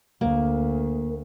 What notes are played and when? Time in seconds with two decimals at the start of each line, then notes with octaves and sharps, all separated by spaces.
0.21 D2 A#3